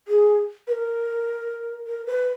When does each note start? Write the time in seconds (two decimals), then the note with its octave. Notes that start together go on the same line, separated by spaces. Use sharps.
0.08 G#4
0.67 B4
0.72 A#4
1.87 A#4
2.06 B4